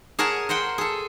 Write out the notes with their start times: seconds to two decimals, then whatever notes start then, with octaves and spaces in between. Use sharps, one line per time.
0.19 G#4 A#4 C#5 F#5 A5
0.49 A#4 C5 F#5 G5
0.78 G#4 A4